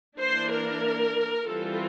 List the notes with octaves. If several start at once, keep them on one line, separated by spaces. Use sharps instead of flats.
E3 A#3 D4 C5
A#4
E3 G3 C4 F4 A4